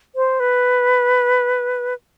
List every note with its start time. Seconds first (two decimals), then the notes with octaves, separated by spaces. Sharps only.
0.16 C5
0.40 B4